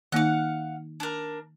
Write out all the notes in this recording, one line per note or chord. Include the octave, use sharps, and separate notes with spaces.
D#3 A#3 D#4 F5 F#5
D4 A#4